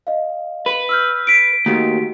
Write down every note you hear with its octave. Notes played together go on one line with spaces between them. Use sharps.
D#5 F5
B4
E6 F6 G6
B6 D7
D#2 A3 F#4 G4